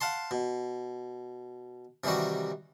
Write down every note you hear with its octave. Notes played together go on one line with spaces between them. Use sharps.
F5 F#5 A5 C6
B2
C3 D#3 E3 G3 F#4